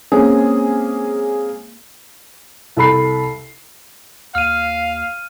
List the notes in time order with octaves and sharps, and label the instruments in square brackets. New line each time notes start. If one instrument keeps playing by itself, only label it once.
[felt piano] G#3 A#3 C4 C#4 G#4
C2 A4 B5 C7
[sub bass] D#2 [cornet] F5 [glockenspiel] F6 D#7